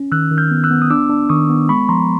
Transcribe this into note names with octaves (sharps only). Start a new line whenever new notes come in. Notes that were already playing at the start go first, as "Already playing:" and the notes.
Already playing: C#4
D#3 E6 F#6
D#3
F6 G6
B3
E6 F#6
B3
D#6
D4 D6 E6
D4
D#3 C#6 D#6
B3
G#3 B5 C#6
F3 A#5 C6